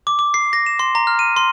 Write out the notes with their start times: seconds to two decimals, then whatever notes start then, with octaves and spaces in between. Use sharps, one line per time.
0.07 D6
0.19 D6
0.34 C7
0.53 A#6
0.66 E7
0.79 C6
0.95 A#5
1.07 F6
1.19 D#7
1.36 C6